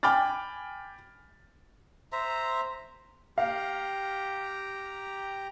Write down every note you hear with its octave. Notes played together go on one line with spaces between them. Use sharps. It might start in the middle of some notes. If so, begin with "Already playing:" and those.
G5 G#5 B5 D6 F6 A6
C5 E5 A#5
G4 F5 A#5